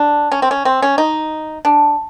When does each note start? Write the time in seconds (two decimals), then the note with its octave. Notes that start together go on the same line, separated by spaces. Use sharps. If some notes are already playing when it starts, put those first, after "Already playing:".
Already playing: D4
0.32 C#4
0.42 C4
0.51 C#4
0.65 C4
0.82 C#4
0.98 D#4
1.65 D4